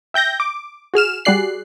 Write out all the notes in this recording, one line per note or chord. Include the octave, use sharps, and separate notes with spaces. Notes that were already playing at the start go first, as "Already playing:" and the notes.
E5 G5 G6 A#6
D6
F#4 G#4 F6 E7
G3 F#4 G#4 D5 F#6 C7